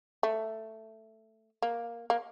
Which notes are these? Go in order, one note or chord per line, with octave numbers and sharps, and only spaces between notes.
A3
A#3
A#3